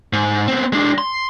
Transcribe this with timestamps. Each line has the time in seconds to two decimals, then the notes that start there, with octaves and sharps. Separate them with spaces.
0.13 G#2
0.48 B3 C4
0.73 G#3 D4
0.98 C6